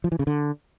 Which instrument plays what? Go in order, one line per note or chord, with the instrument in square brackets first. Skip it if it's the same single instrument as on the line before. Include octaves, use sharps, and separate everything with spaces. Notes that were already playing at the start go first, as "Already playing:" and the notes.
[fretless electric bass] F3
E3
C#3
D3